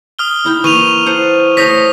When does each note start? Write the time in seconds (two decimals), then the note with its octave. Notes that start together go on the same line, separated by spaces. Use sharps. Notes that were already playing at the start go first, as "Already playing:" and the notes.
0.19 D#6 F6 G7
0.45 D#4 E4 G5
0.64 E3 A#3 C#6 D#7 F7
1.06 A4 C5 F#5
1.57 A3 C5 C#5 D#6 A#6 B6